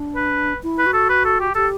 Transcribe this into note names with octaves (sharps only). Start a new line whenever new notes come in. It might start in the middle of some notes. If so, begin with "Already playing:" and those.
Already playing: D4
B4
E4
B4
F#4
A4
B4
A4
G4
G4 A4